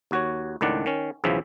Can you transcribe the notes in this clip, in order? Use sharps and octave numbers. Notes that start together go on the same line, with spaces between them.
D#2 F#4 C#5
C#2 A2 D#3 D4 D5 F#5
D#3 C#4
B1 E2 C#3 E3 F3 E5